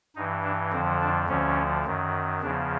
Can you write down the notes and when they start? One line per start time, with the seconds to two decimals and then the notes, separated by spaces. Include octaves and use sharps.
0.16 G2 E3 D#4
0.44 D4
0.72 F2 D3 F3 C4
1.01 D4
1.28 D2 D3 F3 C#4
1.85 F#2 D#3
2.42 E2 C#3 F3 D4